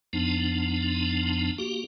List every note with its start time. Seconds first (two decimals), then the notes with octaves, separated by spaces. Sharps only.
0.13 F2 F3 B3 D4 D#4
1.58 A#3 F#4 G4